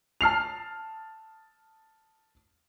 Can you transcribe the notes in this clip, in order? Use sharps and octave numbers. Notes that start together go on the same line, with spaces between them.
A5 F6 C7 F7